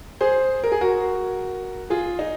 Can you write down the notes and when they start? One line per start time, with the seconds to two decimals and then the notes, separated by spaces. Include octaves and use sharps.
0.21 G#4 C5
0.64 A#4
0.72 G#4
0.81 F#4 A#4
1.90 F4 G#4
2.19 D#4